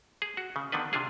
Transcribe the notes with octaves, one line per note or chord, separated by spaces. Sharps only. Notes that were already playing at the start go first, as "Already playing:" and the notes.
G#4
F#4
C#3
D3 D#3 B3 D4 B4
C3 D4 F4 G#4